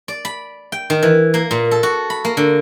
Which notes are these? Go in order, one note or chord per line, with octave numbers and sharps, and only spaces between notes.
D5
B5
G5
D#3
E3
A#3
A#2
A4
F#4
B5
A#3
D3